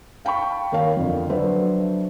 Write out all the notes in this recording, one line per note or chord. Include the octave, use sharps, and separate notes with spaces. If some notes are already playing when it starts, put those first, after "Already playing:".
F5 G5 A5 B5 C#6
D#2 A#4 C#5 F5
F2 D3
F#3 D4 B4 C5 E5